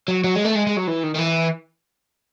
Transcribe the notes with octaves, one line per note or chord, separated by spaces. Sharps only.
F#3
F#3
G#3
A3
G#3
G#3
F#3
E3
D#3
D#3
E3